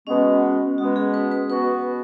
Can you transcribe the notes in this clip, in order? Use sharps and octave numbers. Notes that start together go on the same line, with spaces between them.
B2 G#3 B3 C#4
B2 G#3 B3 F#4
G#4
B4
B4
B2 B3 F#4 B4